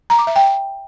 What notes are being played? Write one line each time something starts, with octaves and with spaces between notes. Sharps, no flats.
A#5
D6
E5
G5